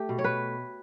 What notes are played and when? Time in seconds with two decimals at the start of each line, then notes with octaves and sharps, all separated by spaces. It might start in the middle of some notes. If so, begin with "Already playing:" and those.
Already playing: A3 G4
0.09 B2
0.19 C#5
0.24 B4